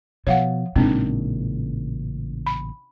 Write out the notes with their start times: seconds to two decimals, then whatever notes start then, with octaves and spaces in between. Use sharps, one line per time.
0.27 B2 F3 C#5 F5 F#5
0.76 A1 A#2 C#3 G#3 C4 D4 D#4
2.46 B5